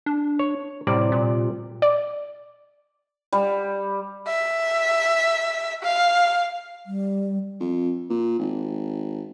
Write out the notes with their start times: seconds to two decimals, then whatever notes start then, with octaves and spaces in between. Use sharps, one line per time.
0.06 D4
0.39 C#5
0.87 A2 C3 G3 D5
1.12 A#2
1.82 D5
3.32 G3
4.27 E5
5.83 F5
6.86 G3
7.60 F2
8.09 A#2
8.39 G#1